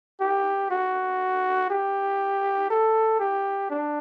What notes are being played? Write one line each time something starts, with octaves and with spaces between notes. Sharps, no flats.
G4
F#4
G4
A4
G4
D4